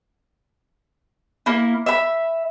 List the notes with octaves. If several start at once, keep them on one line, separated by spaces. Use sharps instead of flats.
A#3 E4
E5 B5